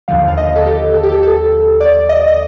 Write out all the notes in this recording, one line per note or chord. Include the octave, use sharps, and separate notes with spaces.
D#2 D3 F3 F5
F5
D#5
A4
G4
A4
G4
A4
A4
D5
D#5
D#5